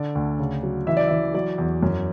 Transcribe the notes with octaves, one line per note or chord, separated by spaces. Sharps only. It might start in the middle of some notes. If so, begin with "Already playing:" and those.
Already playing: D3 D5
D2
C#3
F#3
E3 E5
D5
E3 E5
F#3 D5
E2
F#2